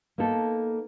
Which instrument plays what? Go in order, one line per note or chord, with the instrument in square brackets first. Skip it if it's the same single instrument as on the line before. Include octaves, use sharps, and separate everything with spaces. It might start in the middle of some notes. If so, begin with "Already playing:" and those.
[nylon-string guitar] A#3 B3 D#4 A4